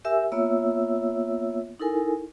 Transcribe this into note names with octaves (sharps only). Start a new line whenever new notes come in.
G4 A#4 E5 G#5 E6
A#3 B3 F4 C#5 E5 E6
D#4 E4 A4 A#4 G#5